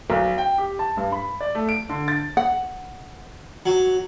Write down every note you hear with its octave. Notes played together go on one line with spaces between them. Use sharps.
B1
G5
G4
A5
G2
B5
D5
A3
D7
D3
A6
F#5
F#3